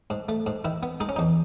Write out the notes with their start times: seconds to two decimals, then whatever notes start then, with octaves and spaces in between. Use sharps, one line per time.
0.10 G#2
0.29 A3
0.46 G#2
0.65 D#3 E4
0.83 B3
1.00 G#3 D#4
1.09 C#4
1.16 E2 D#4